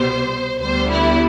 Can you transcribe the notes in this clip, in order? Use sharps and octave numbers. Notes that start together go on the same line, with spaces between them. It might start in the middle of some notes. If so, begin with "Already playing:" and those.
Already playing: C2 B2 G3 B3 C5
D2 D3 G3 B3 C5
E4